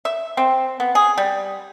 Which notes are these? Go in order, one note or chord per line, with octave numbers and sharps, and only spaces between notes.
E5
C4
B3
G#4
G3